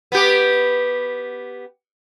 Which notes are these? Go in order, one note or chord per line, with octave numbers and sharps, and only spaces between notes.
B3 G4